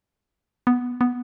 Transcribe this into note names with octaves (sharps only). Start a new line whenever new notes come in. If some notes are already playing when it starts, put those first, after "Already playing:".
B3
B3